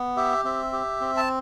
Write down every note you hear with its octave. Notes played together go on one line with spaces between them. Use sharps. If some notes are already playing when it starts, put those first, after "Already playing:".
Already playing: B3
G4 E5
C4 E5
G4
C4
A5